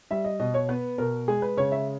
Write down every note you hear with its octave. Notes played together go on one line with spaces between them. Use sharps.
G3 E5
D#5
B2 D#5
C#5
B3 B4
B2 A#4
G#3 G#4
B4
C#3 C#5
E5